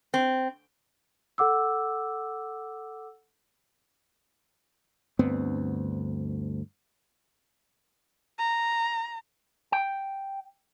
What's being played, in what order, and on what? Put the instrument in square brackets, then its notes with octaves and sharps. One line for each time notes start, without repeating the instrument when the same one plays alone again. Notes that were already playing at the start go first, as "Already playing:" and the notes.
[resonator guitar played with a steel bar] C4
[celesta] A4 F#5 D6 E6
[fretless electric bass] D2 G2 B3 C4
[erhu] A#5
[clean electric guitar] G5